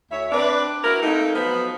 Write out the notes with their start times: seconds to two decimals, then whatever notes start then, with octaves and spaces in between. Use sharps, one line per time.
0.11 D2 C#5 E5
0.31 C4 D4 B4 D5
0.84 E4 F#4 A#4
1.03 A3 A#3 C4 D#4
1.35 F3 F#3 A3 B3 B4 C5